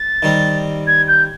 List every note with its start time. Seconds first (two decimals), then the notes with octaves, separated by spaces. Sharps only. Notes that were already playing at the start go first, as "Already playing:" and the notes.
Already playing: A6
0.22 D#3 G3 C4
0.87 G#6
1.08 G6